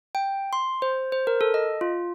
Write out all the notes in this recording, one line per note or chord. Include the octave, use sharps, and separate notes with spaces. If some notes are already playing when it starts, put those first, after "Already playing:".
G5
C6
C5
C5
A#4
A4
D#5
F4